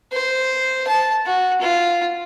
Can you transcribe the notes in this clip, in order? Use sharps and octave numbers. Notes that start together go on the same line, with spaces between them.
C5
A5
F#4
F4